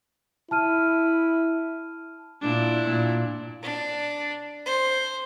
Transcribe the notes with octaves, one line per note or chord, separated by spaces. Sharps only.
E4 A5 F6 D#7
A#2 D4 E4
A#2
D4
C5